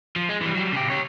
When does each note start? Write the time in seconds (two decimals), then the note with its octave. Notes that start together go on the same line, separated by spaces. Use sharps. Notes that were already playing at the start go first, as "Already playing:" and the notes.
0.16 F3
0.29 G#3
0.41 E3 G3
0.55 F#3 G3
0.72 C#3 G4
0.90 G4 C#5